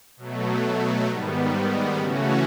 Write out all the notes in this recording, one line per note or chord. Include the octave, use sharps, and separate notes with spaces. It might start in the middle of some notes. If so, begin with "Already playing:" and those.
B2 F#3 A3
G#2 D#3 G3 B3
C#3 E3 A3 C#4 F#4